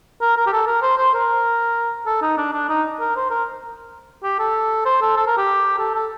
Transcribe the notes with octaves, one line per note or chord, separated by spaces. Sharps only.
A#4
A#4
G4
A4
A#4
C5
C5
A#4
A4
D#4
D4
D4
D#4
A#4
C5
A#4
G4
A4
C5
A4
A4
A#4
G4
A4
A4